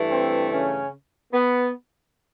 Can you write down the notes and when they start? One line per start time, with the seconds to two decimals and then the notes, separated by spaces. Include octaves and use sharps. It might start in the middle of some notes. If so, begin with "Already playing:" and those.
Already playing: G2 E3 A3
0.11 C4
0.51 C#3 C#4
1.32 B3